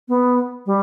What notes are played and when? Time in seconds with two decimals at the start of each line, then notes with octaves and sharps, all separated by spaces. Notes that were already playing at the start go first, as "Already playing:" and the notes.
0.08 B3
0.66 G3